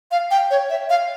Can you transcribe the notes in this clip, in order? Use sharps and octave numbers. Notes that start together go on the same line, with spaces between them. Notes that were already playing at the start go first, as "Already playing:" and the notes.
F5
G5
C#5
E5
F5